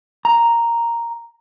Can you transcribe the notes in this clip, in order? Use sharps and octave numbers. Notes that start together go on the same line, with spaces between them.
A#5